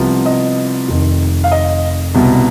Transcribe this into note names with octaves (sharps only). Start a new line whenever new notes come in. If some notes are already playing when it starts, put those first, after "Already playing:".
Already playing: C2 C3 F3 B3
D#5
F1 F2 D#3
F5
D#5
C2 B2 B3